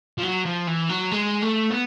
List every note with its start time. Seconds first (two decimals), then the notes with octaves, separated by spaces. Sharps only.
0.18 F3
0.23 F#3
0.45 F3
0.67 E3
0.89 F#3
1.11 G#3
1.42 A3
1.71 B3